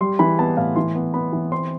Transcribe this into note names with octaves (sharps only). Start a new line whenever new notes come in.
G3 C6
E3 B5
B3 A5
A2 F5
E3 C6
B3
B3 B5
E3
C4 C6